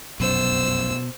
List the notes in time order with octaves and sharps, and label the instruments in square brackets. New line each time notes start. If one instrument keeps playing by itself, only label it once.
[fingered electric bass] F1 B1 F#2 [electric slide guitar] B2 [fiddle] C5 E6